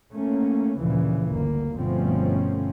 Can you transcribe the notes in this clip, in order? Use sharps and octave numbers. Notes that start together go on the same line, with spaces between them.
A3 A#3 C#4
D2 A#2 C#3 E3 F3
G1 D2 A#3
G1 B2 F3 A3 C4 C#4